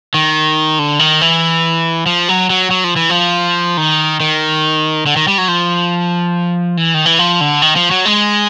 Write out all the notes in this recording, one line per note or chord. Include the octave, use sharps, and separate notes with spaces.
D#3
D3
D#3
E3
F3
F#3
F#3
F#3
F3
E3
F3
D#3
D#3
D3
D#3
G3
F#3
F3
E3
D#3
E3
F3
D3
D#3
F3
F#3
G#3